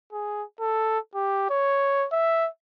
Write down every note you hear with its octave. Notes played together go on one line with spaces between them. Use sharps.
G#4
A4
G4
C#5
E5